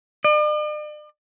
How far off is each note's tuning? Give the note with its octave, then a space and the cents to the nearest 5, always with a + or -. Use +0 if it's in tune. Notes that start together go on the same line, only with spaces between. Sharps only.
D5 +45